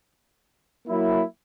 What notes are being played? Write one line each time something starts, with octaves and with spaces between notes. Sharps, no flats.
F#3 A#3 E4